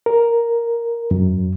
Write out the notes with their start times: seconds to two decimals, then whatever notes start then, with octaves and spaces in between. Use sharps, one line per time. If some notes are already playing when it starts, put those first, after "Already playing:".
0.06 A#4
1.11 F#2